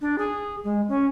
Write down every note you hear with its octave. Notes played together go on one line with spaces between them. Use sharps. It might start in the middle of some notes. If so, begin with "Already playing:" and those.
D4
G#4
G#3
C#4